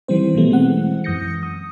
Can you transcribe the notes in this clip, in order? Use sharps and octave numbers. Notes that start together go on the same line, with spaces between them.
D#3 E3 G3 C4 C5
B2 E3 F#3 G3 A3 B3
E3 G#3 C4 F#5
F#2 E3 D#6 G6 A#6 C#7
D#6